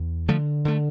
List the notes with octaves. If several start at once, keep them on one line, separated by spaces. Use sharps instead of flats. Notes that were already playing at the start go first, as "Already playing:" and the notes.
Already playing: E2
D3 F3 A3
D3 A3